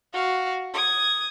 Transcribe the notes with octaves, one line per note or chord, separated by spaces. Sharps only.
F#4 F5
D#6 G#6